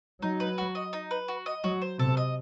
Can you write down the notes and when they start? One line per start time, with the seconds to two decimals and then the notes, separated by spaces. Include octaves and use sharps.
0.22 F#3 D#4
0.40 B4
0.58 F#4
0.75 D#5
0.93 D#4
1.11 B4
1.28 F#4
1.46 D#5
1.64 F#3 F#4
1.82 C5
1.99 C3 A4
2.17 D#5